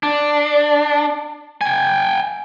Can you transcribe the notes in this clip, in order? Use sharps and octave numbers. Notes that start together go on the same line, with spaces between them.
D4
G5 G#5